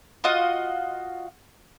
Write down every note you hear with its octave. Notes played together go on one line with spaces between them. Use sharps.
F4 F#4 D#5 F#5